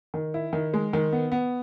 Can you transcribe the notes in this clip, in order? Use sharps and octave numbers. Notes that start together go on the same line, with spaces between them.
D#3
E4
D#3
G#3
D#3
B3
B3